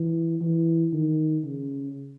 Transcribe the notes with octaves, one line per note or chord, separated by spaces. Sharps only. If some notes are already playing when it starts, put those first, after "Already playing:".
Already playing: E3
E3
D#3
C#3